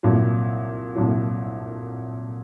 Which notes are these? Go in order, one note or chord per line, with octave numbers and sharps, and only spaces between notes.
C2 A#2 F#3
C2 A#2 F#3